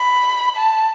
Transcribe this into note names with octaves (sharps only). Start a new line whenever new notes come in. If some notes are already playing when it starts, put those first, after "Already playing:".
Already playing: B5
A5